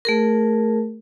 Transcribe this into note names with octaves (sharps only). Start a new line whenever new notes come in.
A3 G#4 A#4